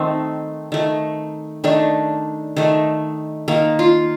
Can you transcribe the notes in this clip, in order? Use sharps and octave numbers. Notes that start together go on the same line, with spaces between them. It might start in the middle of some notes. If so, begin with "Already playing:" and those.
Already playing: D#3 A3 C4
D#3 A3
D#3 A3 D4
D#3 A3
D#3 A#3
F4